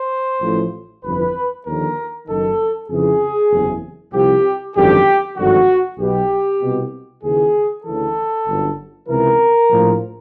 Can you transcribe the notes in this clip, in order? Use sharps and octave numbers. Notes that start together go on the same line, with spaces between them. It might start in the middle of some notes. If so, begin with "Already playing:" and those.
Already playing: C5
A1 A2 F3
G1 F2 C3 E3 B4
D#2 D3 F3 A#4
F#1 F#2 D#3 A4
F2 C#3 E3 G#4
F#1 E2 C3
C2 C3 F3 G4
G#1 F#2 D3 F3 G4
G#1 G2 D3 F3 F#4
B1 B2 G4
C2 B2
D#2 C#3 E3 G#4
D2 C#3 E3 A4
G1 F#2 D3
C#2 C3 E3 A#4
A#1 A2 F3